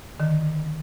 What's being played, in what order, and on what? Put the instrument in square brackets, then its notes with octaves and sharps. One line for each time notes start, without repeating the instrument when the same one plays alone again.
[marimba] D3 D#3